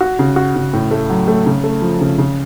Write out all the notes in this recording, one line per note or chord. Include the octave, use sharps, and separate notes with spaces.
F#4
C#3
F#4
C#3
A2
A3
F#3
A3
C#3
A3
F3
C#3
C#3